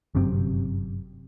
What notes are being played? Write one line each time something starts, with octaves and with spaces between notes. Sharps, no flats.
G1 F#2 C3 C4